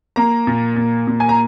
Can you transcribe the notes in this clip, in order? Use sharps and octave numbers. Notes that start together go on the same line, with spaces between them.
A#3 A#5
A#2
A#2
A#2
G#5
A#5